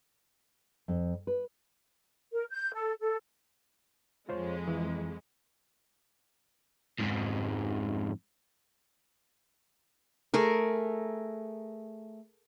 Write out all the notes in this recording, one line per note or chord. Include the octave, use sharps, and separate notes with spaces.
F2
B4
A#4
G6
A4
A4
F2 G#3 F4 C5 C#5
E3
F2 G#2
A3 G#4 A#4